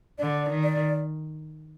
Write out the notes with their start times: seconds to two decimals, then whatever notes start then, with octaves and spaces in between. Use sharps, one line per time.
0.19 D3 D5
0.49 D#3
0.63 D5